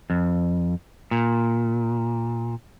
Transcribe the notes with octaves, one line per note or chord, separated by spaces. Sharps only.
F2
A#2